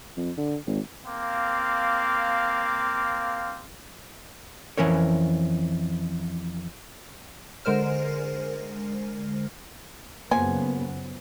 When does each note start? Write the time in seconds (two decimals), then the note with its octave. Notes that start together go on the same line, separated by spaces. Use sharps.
0.17 F2
0.37 D3
0.67 G#1
1.06 A#3 C4 F5 D6
4.78 F2 E3 C#4 A#4 C#5
7.65 D3 G#3 A#4 C5 F6
10.31 F#2 C#3 F3 A#3 B3 G#5